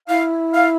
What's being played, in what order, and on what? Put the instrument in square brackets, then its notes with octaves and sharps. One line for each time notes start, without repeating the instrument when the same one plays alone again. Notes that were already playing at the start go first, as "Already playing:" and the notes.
[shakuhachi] E4 [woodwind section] F5
[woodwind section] F5